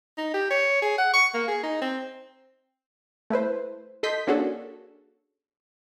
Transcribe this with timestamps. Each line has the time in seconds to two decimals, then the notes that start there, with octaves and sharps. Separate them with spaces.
0.18 D#4
0.34 G4
0.50 C#5
0.82 G#4
0.98 F#5
1.13 C#6
1.34 A#3
1.48 G#4
1.63 D#4
1.81 C4
3.30 A3 E4 B4 C5
4.03 A4 D#5 C6 G6 B6
4.27 A#3 C#4 D4 F#4 G#4 A4